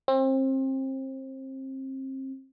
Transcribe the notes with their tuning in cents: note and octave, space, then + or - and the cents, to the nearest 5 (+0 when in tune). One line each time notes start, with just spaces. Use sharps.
C4 +30